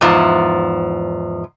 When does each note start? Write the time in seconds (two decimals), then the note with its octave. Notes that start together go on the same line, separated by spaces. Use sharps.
0.01 E2 G#2 F3